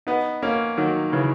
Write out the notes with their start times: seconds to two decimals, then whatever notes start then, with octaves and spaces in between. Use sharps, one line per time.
0.07 B3 D#4
0.42 A#3 C#4
0.77 D#3 F#3
1.12 C#3 E3